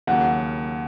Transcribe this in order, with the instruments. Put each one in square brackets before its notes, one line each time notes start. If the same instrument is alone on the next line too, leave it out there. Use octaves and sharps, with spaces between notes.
[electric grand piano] D#2 C#3 F#3 A#3 [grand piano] F#5